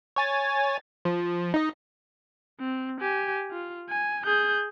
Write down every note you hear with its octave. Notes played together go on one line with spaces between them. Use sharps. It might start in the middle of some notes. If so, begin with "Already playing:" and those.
C#5 G#5 A6
F3
D#4 D#5
C4
G4 G#5
F4
G#5
G#4 G6